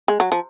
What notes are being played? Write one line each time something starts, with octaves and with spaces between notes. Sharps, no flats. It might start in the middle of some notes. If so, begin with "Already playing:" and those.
G#3
F#3
F3